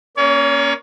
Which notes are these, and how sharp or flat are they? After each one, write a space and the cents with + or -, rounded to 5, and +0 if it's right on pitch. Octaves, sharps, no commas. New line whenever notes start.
A#3 +15 C#4 +0 C#5 +40